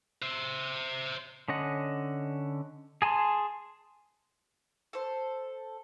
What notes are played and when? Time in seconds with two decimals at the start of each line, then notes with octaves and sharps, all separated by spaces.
0.22 C5 E5
1.48 D3 C#4 D#5 F#5
3.02 G#4 G#5 A5 C6
4.93 A4 C5